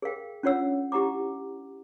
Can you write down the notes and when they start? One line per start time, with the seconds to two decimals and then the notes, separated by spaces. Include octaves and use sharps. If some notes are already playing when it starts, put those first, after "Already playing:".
0.02 G#4 A#4 F5 G5
0.43 C#4 D4 F4 C#5 F#5 E6
0.92 E4 G4 F#5 A#5 D6